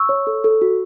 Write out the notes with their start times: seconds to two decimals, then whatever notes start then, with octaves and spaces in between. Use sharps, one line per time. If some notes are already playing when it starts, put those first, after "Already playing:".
Already playing: C#6 E6
0.09 C#5
0.27 A4
0.44 A4
0.62 F#4